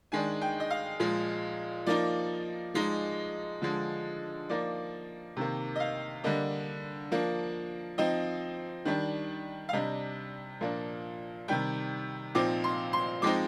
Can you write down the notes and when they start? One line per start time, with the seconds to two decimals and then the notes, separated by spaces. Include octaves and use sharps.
0.12 D#3 G#3 D4 G#5
0.42 G5
0.60 D#5
0.70 F5
1.00 A#2 F3 G#3
1.86 F3 A#3 D#4 D5
2.74 F3 G#3 D#4
3.62 D3 F3 G#3
4.49 F3 A#3 D#4 D5
5.37 C3 D#3 A#3
5.76 D#5
5.80 F5
6.24 D3 G3 A#3 D4 D#5
7.11 F3 A#3 D4
7.98 F3 C4 D#4 D#5
8.85 D#3 G3 D4
9.69 F5
9.73 C3 G3 D4 D#5
10.61 A#2 F3 A#3 D4
11.48 C3 D#3 G3 G5
12.35 A#2 F3 C4 D#4 D6
12.64 C6
12.93 C6
13.22 F3 G#3 C4 D#4 D6